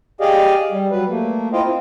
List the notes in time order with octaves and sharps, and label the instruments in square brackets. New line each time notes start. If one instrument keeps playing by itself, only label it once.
[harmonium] G4 G#4 D5 D#5 F5
G3
F#3 G3 B4
A3 A#3
E4 F4 C5 D#5 F5 G5
C4